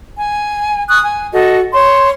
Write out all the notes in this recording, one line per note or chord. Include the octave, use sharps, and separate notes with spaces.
G#5
C#6 D#6 F#6
G#5
F#4 A4 D#5
C#5 C6